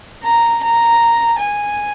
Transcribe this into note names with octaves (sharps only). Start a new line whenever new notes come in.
A#5
A#5
G#5